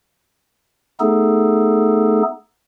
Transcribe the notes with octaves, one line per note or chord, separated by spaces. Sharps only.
A3 B3 D#4 G#4 A4